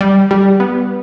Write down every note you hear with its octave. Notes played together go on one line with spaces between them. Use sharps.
G3
G3
B3